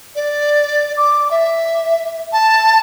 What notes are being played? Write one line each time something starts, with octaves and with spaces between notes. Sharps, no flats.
D5
D6
E5
A5